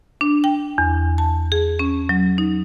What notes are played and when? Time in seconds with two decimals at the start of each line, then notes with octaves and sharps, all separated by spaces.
0.21 D4
0.44 G5
0.78 E2
1.18 A5
1.52 G#4
1.79 C#4
2.09 F#3
2.38 D#4